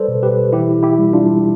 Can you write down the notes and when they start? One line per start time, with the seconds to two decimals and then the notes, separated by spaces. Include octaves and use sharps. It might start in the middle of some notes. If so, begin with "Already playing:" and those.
Already playing: G3 A4 B4 C5 D5
0.08 B2
0.23 G4 B4
0.53 E3 E4 G4
0.83 E4 G4
0.99 G3
1.13 D4 F4